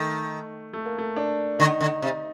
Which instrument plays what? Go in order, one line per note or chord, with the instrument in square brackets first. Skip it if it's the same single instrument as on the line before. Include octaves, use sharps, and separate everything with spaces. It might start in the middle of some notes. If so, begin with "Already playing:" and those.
Already playing: [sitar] D#3 [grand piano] A3
[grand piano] A3
A#3
A3
D4
[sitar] D3 [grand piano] D#4
[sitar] D3
C3